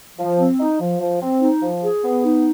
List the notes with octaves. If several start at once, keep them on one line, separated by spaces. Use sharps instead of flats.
F3
C4
D#4
F3
F3
C4
D#4
F3
G#4
B3
D#4